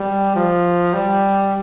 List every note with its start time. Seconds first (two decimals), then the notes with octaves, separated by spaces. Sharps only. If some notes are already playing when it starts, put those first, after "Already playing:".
Already playing: G3
0.36 F3
0.94 G3